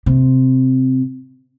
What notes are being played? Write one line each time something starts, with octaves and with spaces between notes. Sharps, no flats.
C3